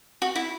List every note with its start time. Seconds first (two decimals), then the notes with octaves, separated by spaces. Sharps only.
0.22 F#4
0.36 E4